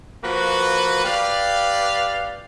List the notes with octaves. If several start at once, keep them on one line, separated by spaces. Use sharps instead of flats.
F3 A#3 F#4 B4
G4 B4 D5 F5